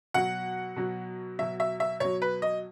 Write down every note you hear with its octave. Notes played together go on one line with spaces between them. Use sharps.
B2 F#3 F#5
B2 F#3
B2 F#3 E5
E5
E5
B2 F#3 C#5
B4
D#5